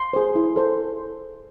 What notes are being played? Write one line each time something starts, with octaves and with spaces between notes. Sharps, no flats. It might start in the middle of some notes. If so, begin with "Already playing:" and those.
Already playing: C6
G#4 C5
E4
A4 C5